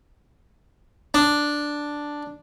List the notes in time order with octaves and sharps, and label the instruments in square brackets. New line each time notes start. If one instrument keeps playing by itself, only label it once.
[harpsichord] D4